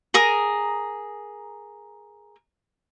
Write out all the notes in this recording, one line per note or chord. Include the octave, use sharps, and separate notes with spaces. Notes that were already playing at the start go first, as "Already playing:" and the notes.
G#4 A#4 A#5 D#6